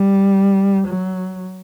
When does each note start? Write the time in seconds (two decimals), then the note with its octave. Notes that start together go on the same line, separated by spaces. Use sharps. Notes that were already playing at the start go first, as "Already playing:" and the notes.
Already playing: G3
0.88 F#3